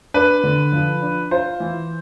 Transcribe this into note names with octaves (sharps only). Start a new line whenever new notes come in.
D4 B4
D3
F3
D4
F4 C5
E3